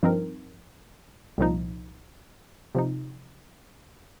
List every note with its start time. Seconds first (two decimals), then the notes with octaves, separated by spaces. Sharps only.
0.03 G2 F3 C4 D#4 A#4
1.38 C2 A#2 F3 D#4
2.75 C3 F3 D#4